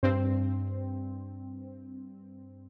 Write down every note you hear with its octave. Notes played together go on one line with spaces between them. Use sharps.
G2 C4